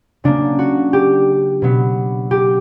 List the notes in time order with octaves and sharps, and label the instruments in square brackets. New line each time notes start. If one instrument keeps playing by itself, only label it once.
[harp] C#3 F#3 A#3 D4
F#4
G4
B2 F#3 B3
G4